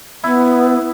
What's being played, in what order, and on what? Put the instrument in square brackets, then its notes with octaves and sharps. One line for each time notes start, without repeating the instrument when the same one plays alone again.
[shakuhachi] B3 [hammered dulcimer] E4